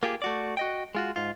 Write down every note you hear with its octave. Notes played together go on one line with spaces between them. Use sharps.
A#3 F4 G4 G#4
A3 F#4 D5
F#4 D#5 G5
G#3 F4 F#4
G#2 F4